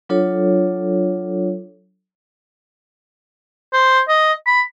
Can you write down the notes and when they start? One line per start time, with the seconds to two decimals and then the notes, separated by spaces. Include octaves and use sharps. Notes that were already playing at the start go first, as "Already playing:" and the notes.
0.09 F#3 D4 F4 A4 C#5
3.73 C5
4.08 D#5
4.47 B5